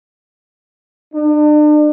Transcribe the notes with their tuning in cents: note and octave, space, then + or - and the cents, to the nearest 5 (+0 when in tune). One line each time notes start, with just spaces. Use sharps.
D4 +40